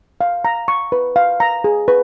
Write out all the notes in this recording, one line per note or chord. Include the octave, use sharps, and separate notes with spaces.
F5
A#5
C#6
B4
F5
A#5
G#4
B4